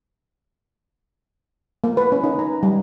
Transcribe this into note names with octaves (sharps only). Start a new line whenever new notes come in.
A#3
B4
C#4
D#4
A#5
G3